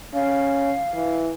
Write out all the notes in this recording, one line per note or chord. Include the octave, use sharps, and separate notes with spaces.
C#4 F5
E3